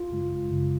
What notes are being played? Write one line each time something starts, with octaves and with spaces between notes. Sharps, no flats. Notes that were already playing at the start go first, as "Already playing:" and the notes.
Already playing: G#1 F4
F#2 C#3 G#3
G#1
F#2 C#3 G#3